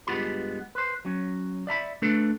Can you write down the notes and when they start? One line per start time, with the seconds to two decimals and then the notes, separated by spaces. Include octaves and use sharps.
0.07 G2 G#3 B3 F4 G4 B5
0.75 B4 C5
1.05 F#3 C#4
1.67 D5 E5 A#5 B5
2.02 A3 D4 A4 B4